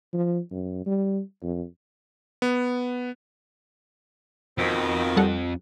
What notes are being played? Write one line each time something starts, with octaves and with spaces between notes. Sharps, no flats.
F3
F#2
G3
F2
B3
F2 B2 D#3 C4
G3 A4 F#5